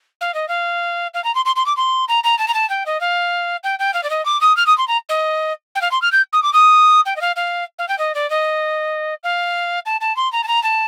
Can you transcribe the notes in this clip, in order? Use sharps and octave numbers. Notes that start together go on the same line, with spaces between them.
F5
D#5
F5
F5
A#5
C6
C6
C6
D6
C6
A#5
A#5
A5
A#5
A5
G5
D#5
F5
G5
G5
F5
D5
D#5
D6
D#6
F6
D#6
C6
A#5
D#5
G5
F5
C6
F6
G6
D#6
D6
D#6
G5
D#5
F5
F5
F5
G5
D#5
D5
D#5
F5
A5
A5
C6
A#5
A5
A#5
A5